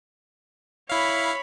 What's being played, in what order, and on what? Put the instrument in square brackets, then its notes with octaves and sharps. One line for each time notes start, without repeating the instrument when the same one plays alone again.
[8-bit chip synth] E4 F5 [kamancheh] C#5 B5